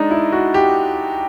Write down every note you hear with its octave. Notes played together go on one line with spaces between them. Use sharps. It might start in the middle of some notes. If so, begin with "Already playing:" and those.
Already playing: G#3 D4 D#4
E4
F#4
G4